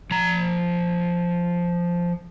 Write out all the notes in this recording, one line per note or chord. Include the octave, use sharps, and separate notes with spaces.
F3 A#5